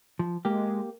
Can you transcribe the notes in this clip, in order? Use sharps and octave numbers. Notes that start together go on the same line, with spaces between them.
F3
G#3 A#3 G4